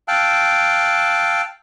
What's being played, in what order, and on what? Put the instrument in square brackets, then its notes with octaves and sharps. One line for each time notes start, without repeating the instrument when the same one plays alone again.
[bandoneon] F5 G5 A5 E6 F#6